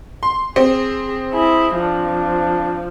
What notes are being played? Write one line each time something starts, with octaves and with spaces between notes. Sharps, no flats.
C6
C4 G#4
E4 G#4
F3 D4